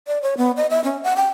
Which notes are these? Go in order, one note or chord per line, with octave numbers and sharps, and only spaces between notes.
D5
C#5
B3
D#5
E5
C#4
F#5
G5